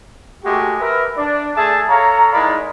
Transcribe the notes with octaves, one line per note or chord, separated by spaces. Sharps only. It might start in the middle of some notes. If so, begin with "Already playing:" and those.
G#3 A3 F#4 G4
A#4 B4 E5
D4 D5
A3 G#4 E5 A5
A4 C#5 F5 A#5
G#3 D#4 E4 A#4 D5 B5